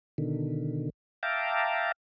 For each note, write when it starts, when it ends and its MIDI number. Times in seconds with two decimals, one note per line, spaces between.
0.18 0.90 47
0.18 0.90 50
0.18 0.90 51
1.23 1.92 76
1.23 1.92 77
1.23 1.92 79
1.23 1.92 81
1.23 1.92 82
1.23 1.92 86